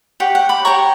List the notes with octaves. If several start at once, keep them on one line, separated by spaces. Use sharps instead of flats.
G4 C#5 F#5
F#5
B5 D6
G4 C#5 A#5 C#6